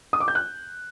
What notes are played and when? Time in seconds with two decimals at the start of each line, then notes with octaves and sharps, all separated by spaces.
0.13 D#6
0.20 D6
0.28 G6
0.35 F#6